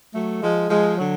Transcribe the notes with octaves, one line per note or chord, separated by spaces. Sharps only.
F#3 A3
F3 G#3
F3 G#3
D3 F#3